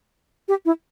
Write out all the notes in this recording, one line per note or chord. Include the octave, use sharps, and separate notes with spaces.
G4
E4